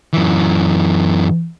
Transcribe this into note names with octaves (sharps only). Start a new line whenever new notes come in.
F#2 E3